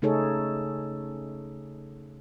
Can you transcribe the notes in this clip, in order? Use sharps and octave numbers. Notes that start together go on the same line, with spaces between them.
C#3 A3 D#4 G#4 A4 C#5